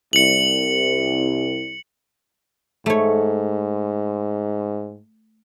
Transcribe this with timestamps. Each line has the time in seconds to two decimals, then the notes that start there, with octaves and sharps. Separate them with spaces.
0.13 C2 C#7 F#7
2.86 G#2 A3 C#5